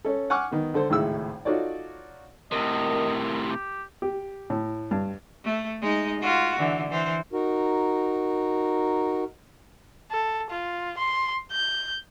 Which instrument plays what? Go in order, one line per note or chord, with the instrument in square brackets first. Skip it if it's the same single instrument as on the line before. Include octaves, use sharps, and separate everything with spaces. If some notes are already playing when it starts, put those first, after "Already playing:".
[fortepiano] C#4 A4
F#5 G#5 C#6 D6 F6
D#3 B3
D3 A4 C5
G#1 C#2 A2 G#3 E4 E6
D#4 F4 F#4 A4 C#5 D5
[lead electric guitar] A2 C3 [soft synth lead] A#4 [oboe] D#5
[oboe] G4
[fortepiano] G4
A2
G2
[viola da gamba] A3
G#3 D#4 D#5
F4 F#4
D3 E3
E3 C5
[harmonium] D#4 F#4 A#4
[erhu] A4
F4
C6
G6